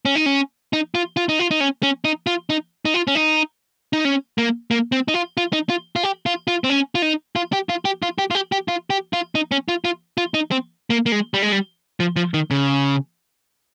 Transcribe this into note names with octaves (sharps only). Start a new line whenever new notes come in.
C#4
D#4
C#4
D#4
F4
F4
D#4
F4
D#4
C#4
C#4
D#4
F4
D#4
D#4
F4
C#4
D#4
D#4
C#4
A#3
A#3
C4
D#4
F4
F4
D#4
F4
F4
G4
F4
F4
C4
C#4
F4
D#4
F4
G4
F4
G4
F4
G4
F4
G4
G4
F4
G4
F4
D#4
C#4
F4
F4
F4
D#4
C4
A#3
A#3
G#3
G3
G#3
G3
F3
F3
D#3
C#3